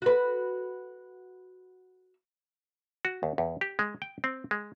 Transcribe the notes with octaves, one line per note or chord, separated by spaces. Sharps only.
F#4 B4
F#4
D#2
E2
G4
G#3
G5
C4
G#3